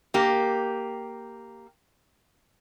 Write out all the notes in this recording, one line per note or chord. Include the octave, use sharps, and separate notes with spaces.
A#3 G4